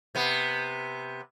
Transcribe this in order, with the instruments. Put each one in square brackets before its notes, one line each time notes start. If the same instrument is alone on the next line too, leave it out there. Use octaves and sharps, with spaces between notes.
[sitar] C3 B3